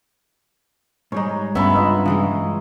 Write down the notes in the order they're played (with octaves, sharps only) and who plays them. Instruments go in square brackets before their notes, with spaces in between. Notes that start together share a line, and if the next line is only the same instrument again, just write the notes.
[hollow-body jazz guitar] G#2 G3 G#3 [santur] D#4 C#5
[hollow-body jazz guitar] C#2 C#3 [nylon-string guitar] G2 B3 [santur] E5 A#5 B5
[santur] F4 D#5 E5
[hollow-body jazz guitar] C#3 E3 G#3 [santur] D#6